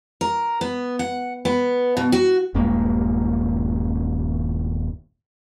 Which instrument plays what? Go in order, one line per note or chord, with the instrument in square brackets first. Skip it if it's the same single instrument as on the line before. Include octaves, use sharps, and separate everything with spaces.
[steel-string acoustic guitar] A#4
B3
F#5
B3
B2
F#4
[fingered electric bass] D#1 G2 G#3 A#3